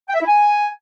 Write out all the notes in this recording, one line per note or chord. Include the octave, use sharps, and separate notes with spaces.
G5
E5
E4
G#5